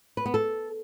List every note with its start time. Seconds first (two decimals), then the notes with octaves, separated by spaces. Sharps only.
0.17 B4
0.26 B3
0.34 A4